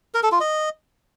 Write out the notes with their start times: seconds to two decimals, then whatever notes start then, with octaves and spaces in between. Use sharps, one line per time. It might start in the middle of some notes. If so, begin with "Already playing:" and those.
0.14 A#4
0.23 A4
0.32 F4
0.40 D#5